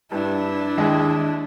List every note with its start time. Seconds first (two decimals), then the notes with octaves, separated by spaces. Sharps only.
0.12 G2 D4 E4
0.78 D#2 G#3